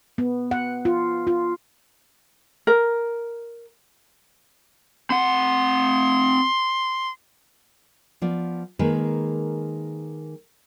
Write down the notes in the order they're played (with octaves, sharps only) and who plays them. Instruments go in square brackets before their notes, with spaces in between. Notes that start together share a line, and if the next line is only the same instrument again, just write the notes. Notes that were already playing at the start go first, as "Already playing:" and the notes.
[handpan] B3
F#5
F4
F4
[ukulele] A#4
[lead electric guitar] C4 F#5 [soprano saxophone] C6
[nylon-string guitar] F3 B3 D5
D#3 G#3 A#3 G#4 B4